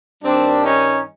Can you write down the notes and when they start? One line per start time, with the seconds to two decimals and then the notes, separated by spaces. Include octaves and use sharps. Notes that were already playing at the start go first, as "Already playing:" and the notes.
0.23 G2 D#3 G3 C4 D4
0.64 C#4 D#4